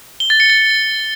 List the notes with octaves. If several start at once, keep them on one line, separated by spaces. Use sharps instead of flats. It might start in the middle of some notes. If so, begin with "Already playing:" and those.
G7
A6
C#7
A6